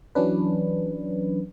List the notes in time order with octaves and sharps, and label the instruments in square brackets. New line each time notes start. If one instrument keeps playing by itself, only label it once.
[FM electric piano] E3 F#3 C#4 D4 B4